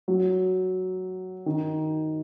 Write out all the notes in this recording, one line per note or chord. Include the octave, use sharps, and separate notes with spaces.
F#3
D#3